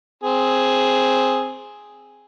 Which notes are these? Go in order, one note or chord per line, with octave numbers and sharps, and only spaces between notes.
C4 G#4